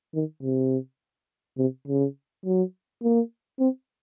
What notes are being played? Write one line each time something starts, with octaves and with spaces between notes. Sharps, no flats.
D#3
C3
C3
C#3
F#3
A#3
C4